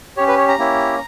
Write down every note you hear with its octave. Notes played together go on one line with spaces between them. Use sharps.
C#4 G4 C#5
B4
C#5
A#5
A#3 C#4 E4 G4